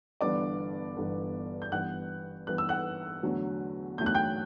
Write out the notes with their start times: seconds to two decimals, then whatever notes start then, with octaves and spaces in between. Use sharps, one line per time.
0.21 G1 G2 E3 B3 D4 D5 D6
0.96 G1 G2 E3 B3 D4
1.62 G6
1.72 G2 E3 B3 F#5 F#6
2.47 G2 E3 B3 F#6
2.58 E6
2.69 F#5 F#6
3.23 E2 D3 F#3 A3
3.98 E2 D3 F#3 A3 G6
4.06 F#6
4.15 G5 G6